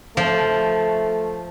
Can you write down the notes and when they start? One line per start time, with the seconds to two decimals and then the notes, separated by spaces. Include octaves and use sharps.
0.17 F3 A3